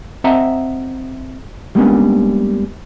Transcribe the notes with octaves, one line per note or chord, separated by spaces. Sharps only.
C4 D#5 E5 F#5 A5 A#5
G3 G#3 A#3 B3 C#4 D4